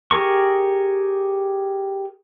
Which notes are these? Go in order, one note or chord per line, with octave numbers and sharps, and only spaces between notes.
G4 G#4 A#4 C#6